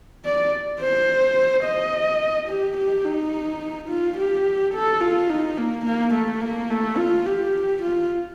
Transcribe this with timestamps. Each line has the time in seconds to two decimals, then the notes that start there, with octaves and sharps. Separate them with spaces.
0.25 D5
0.81 C5
1.64 D#5
2.49 G4
2.77 G4
3.05 D#4
3.89 F4
4.18 G4
4.74 A4
5.01 F4
5.29 D#4
5.57 A#3
5.85 A#3
6.14 A3
6.41 A#3
6.70 A3
6.98 F4
7.26 G4
7.82 F4